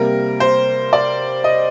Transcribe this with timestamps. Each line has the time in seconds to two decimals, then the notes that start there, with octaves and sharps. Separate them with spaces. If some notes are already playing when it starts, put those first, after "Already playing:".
Already playing: C3 G3 A#3 A#4
0.40 C5
0.93 D5
1.44 D#5